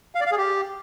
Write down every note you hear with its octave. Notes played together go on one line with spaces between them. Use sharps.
F5
D5
F5
G#4
G4